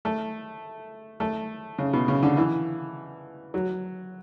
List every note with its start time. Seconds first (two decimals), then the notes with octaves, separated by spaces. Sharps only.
0.05 A3
1.20 A3
1.78 C#3
1.93 B2
2.08 C#3
2.23 D3
2.37 E3
3.54 F#3